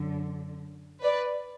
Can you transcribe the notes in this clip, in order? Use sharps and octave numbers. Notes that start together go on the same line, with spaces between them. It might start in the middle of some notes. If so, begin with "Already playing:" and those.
Already playing: F#2 D3
B4 D5